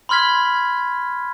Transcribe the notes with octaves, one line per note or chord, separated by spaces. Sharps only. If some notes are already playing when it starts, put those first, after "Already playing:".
B5 C6 F6 G#6 B6